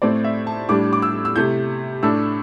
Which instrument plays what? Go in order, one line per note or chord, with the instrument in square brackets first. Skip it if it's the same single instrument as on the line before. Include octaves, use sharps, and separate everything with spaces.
[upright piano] A2 A3 C4 D5
E5
A5
A2 G3 D4 D6
D6
E6
E6
C3 A3 E4 G6
A2 A3 D4 E6